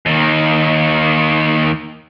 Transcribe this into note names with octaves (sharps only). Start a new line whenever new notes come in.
D#2 D#3